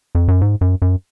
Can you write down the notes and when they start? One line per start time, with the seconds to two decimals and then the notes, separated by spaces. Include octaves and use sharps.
0.15 F2
0.28 F#2
0.41 G#2
0.61 F#2
0.82 F#2